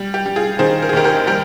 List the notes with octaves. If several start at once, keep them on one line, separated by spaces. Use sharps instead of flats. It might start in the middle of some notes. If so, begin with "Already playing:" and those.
Already playing: G3
G4
G3
F4 G#4
D#3 G#4 C5
A#4
G#4
D#2 G4 A#4
G4 A#4
G3 G4 A#4